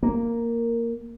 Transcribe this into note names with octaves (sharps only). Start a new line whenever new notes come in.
A#3